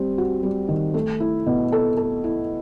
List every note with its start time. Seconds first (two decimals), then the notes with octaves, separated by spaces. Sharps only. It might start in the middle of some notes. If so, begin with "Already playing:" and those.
Already playing: G3 C4
0.18 F#4
0.43 G3
0.69 D#3
0.94 A3
1.20 E4
1.46 B2
1.72 A4
1.97 A4
2.24 E4